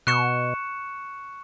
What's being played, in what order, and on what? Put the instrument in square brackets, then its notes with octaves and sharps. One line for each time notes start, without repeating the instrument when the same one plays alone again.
[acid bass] B2 [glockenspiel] C#6 F#6 C#7 E7